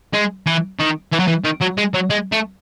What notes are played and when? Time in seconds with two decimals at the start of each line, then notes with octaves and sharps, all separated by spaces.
0.14 G#3
0.46 E3
0.79 D#3
1.12 E3
1.19 F#3
1.27 E3
1.45 D#3
1.61 F#3
1.78 G#3
1.94 F#3
2.10 G#3
2.32 A3